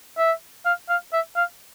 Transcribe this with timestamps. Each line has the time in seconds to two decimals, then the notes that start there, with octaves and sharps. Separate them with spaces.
0.18 E5
0.66 F5
0.89 F5
1.13 E5
1.36 F5